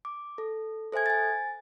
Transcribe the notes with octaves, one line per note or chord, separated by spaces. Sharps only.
D6
A4
A4 C5 E5 G#5 G#6
G#5 A6